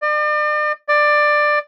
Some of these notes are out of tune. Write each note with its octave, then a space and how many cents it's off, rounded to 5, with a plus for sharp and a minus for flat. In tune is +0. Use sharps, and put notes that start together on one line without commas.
D5 +40
D5 +15